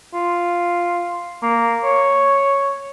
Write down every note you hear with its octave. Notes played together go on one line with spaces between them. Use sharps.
F4
A#3
C#5